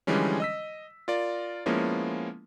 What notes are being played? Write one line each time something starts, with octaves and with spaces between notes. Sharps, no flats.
D3 E3 F3 G3 G#3 C#4
D#5 E6 B6
F4 A#4 D5
F3 G#3 A#3 B3 C#4 E4